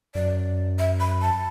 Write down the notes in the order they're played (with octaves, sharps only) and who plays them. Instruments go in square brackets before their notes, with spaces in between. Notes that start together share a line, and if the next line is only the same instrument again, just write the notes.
[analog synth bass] F#2 [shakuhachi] D5
[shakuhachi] E5
B5
A5